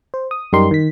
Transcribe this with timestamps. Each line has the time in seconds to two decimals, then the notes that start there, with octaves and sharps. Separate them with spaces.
0.14 C5
0.31 D#6
0.53 F#2 G3 D#4 G4 A#4 C6
0.71 D#3 B6